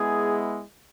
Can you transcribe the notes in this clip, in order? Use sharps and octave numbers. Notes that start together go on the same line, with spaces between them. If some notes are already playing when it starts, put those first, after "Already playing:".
Already playing: G#3 B3 E4 G#4